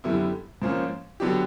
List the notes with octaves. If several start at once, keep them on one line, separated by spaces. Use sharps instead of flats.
F#2 D3 G3 B3 E4
G#2 F3 A#3 C#4
D3 F#3 B3 D4 G4